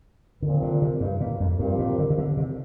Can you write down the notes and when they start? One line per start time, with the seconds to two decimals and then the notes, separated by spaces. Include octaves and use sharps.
0.42 A#2 D3 F3 C4 A#4
0.62 D3
0.82 C3
1.00 G2
1.20 A#2
1.40 F2
1.59 G2 F3 C4 G4 A#4
1.78 A#2
1.99 D3
2.10 C3
2.18 D3
2.37 C3